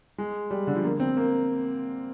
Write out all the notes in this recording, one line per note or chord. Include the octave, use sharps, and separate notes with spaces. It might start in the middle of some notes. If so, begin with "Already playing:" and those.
G#3
G3
D3
F3
A#3
C4
A#3